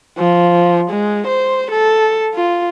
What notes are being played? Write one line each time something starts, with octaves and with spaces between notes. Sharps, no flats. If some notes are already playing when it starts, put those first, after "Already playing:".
F3
G#3
C5
A4
F4